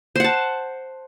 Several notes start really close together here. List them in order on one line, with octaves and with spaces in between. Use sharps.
C5 F#5 A5